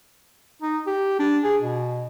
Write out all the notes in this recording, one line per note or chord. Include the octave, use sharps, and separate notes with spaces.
D#4
G4
D4
G#4
B2